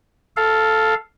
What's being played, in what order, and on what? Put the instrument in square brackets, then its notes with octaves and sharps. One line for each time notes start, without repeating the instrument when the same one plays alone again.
[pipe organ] A4 F5